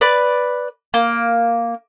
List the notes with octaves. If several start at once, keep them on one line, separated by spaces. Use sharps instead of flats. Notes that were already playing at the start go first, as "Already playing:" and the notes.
B4 D5
A#3